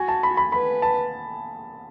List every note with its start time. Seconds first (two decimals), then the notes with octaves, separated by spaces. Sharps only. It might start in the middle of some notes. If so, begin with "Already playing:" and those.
Already playing: F#4 G#5
0.08 A5
0.23 B5
0.37 B5
0.52 B4 B5
0.82 A5